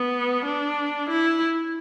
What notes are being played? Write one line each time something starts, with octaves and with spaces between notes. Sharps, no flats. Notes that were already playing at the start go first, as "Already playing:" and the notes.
Already playing: B3
D4
E4